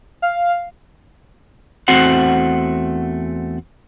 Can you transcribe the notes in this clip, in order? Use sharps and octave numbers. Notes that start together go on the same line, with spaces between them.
F5
E2 A3 C4 F#4 C5 F#5